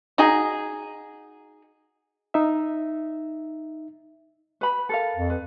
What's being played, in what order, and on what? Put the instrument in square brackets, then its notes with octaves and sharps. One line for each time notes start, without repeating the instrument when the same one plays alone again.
[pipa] D#4 F#4 G#4
[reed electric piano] D#4 E5
[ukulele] B4 B5
A4 A#4 F5
[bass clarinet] F2
[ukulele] B4